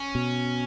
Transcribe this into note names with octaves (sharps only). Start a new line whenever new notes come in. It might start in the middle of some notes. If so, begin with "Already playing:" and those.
Already playing: C#4
B2